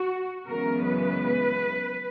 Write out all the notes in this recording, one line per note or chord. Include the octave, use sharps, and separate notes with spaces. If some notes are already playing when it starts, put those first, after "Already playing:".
Already playing: F#4
F#2 C#3 E3 G#3 B3 A#4
B4